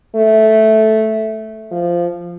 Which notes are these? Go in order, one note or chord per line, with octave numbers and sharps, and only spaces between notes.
A3
F3